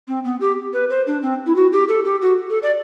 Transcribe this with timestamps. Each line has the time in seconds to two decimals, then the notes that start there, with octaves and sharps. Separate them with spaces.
0.08 C4
0.24 B3
0.41 G4
0.73 B4
0.90 C5
1.07 D4
1.22 C4
1.46 E4
1.56 F#4
1.73 G4
1.89 A4
2.05 G4
2.22 F#4
2.50 A4
2.63 D5